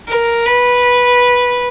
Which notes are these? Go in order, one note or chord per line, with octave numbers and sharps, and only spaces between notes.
A#4
B4